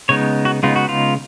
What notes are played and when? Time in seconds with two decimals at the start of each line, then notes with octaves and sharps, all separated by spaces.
0.09 C#3 G#3 B3 D#4 C#5
0.45 F#4
0.63 C#3 G#3 B3 D#4 F4
0.76 F#4
0.89 F4